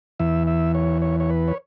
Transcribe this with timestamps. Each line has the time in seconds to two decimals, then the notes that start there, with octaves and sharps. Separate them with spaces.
0.19 E2 E3 E5
0.47 E5
0.75 C#5
1.02 C#5
1.20 C#5
1.30 B4
1.48 C#5